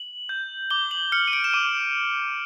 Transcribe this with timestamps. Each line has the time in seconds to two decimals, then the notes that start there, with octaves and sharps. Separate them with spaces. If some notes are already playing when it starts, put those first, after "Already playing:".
Already playing: F#7
0.29 G6
0.71 D6 G7
0.91 F#7
1.12 F6 C#7
1.28 D#7
1.33 D7
1.44 E7
1.53 D6 D#7